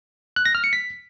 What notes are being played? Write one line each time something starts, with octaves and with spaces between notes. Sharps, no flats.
F#6
A#6
F6
C#7
B6